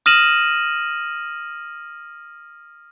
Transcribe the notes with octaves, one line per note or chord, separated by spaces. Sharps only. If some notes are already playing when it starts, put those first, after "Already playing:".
D#6 F6 A#6 D#7 E7 F#7